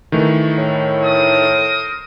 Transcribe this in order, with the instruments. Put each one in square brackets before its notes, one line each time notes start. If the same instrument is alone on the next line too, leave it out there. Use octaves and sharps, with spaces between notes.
[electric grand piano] D#3 E3 A3
[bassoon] A2
[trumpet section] A#4 C5 D#6